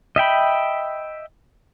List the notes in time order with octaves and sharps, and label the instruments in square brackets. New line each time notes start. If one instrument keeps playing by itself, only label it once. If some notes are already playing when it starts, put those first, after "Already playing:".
[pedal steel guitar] D#5 E5 G5 B5